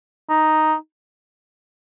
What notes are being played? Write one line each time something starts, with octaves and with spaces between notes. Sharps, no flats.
D#4